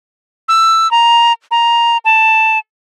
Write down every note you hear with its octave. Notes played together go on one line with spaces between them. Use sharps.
E6
A#5
A#5
A5